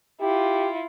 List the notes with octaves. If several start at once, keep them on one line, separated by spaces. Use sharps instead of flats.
E4 F4 G4